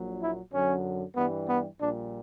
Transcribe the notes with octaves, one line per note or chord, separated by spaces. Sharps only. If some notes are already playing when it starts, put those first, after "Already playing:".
Already playing: A#1 A#2 F#3
E4
F#2 D3 F#3 C#4
G2 E3 G3 B3
B3
A#1 A#2 G3 D4